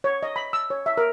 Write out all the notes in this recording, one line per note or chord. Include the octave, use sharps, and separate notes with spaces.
C#5
D#5
B5
E6
C#5
E5
A#4